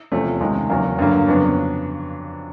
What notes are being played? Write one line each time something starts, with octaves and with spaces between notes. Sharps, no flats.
E2 C3 F3 A3 C#4
C#2 C3 D#3 G#3
E2 C#3 F#3 A#3
G2 D3 F#3 A#3
F2 C#3 F#3 B3 D4